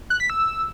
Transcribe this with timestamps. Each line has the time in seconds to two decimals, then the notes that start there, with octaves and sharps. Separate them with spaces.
0.10 F#6
0.20 B6
0.30 E6